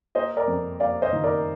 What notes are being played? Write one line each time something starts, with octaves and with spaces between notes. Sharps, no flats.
A#3 C5 D#5
A#4 D5
F2
A#3 D5 F5
C5 D#5
D#3
A#4 D5